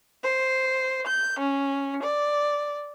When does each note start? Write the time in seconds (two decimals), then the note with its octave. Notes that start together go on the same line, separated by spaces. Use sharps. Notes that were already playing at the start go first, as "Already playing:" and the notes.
0.23 C5
1.07 G6
1.39 C#4
2.02 D5